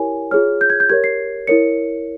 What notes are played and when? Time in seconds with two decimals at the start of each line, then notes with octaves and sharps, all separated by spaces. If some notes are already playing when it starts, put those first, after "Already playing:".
Already playing: E4 G4 A#4 C#5 G#5
0.31 F4 G#4 C#5 F6
0.61 G6
0.70 G#6
0.80 G6
0.90 G4 A#4 C#5 G#6
1.04 C7
1.47 E4 A#4 C#5 C#7